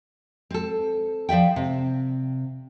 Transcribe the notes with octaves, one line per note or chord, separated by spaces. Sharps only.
C4 A4
F3 D5 E5 G5
C3